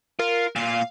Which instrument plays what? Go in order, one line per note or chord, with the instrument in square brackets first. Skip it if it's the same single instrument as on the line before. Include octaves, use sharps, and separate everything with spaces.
[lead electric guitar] F4 [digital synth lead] A#4
[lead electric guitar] A#2 F4 [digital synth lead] F5